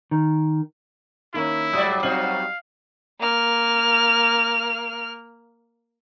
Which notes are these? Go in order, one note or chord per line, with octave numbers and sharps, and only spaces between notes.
D#3
D#3 A#3 C#4 E4
G#2 F#3 G3 D5 D#6
C4 D#4 F#4 F5 F#7
A#3 F6